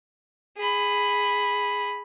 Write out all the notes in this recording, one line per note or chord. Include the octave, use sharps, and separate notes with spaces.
G#4 B5